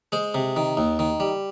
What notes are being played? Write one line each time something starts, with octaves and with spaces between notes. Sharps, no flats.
G#3 C5
C3
D#3
D#2
D#3
G3